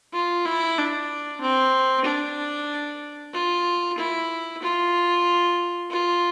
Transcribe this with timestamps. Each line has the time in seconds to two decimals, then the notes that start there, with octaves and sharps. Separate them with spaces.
0.14 F4
0.46 E4
0.78 D4
1.41 C4
2.05 D4
3.34 F4
3.98 E4
4.63 F4
5.91 F4